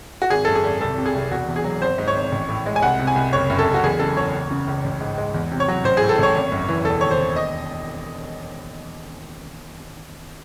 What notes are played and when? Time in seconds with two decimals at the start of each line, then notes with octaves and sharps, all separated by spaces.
0.22 F#4
0.30 G#1 G#4
0.45 F#2 A4
0.55 G#4
0.65 G#1
0.81 C2 A4
0.98 C3
1.06 G#4
1.14 C2
1.31 E1 F#4
1.48 E2
1.56 G#4
1.64 F#3
1.82 G#1 C5
1.98 G#2
2.07 C#5
2.15 G#1
2.32 A1
2.48 A2
2.66 G#3
2.76 G#5
2.82 C2 F#5
2.99 C3
3.07 G#5
3.16 C2
3.33 F#1 C#5
3.50 F#2
3.59 A4
3.67 F#1
3.74 F#4
3.83 E2 G#4
3.99 C#3 A4
4.16 E2 C#5
4.33 C#2
4.51 C#3
4.67 C#2
4.84 A1
5.00 G#2
5.18 G#3
5.34 E2
5.51 C3
5.60 C#5
5.68 F#3
5.84 A1 C5
5.97 A2 G#4
6.09 A4
6.18 A1 C#5
6.35 G#1
6.52 F#2
6.68 E3
6.85 E1 A4
7.01 D#2 C#5
7.11 C5
7.18 E1
7.36 D#5